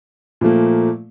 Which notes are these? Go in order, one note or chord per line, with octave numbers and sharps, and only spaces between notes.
A#2 F3 A3 A#3